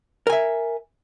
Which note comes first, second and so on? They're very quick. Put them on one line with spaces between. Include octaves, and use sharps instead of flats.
A#4 G#5 E5